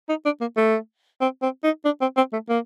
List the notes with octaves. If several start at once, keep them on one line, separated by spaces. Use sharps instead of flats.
D#4
D4
A#3
A3
C4
C4
D#4
D4
C4
C4
A3
A#3